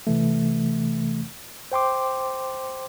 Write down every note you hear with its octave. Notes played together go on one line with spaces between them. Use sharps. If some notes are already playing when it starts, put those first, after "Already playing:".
C3 E3 A3
C5 G5 C6 D6